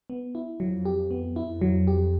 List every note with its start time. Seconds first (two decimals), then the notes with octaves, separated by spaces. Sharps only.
0.10 B3
0.35 E4
0.60 F2 F#3
0.85 G4
1.11 B3
1.36 F2 E4
1.61 F#3
1.87 G4